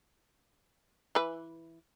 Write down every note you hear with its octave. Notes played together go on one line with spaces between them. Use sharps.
E3 B4